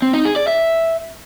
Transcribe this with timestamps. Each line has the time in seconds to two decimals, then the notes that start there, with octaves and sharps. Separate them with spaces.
0.02 C4
0.14 D#4
0.25 G#4
0.36 D5
0.48 E5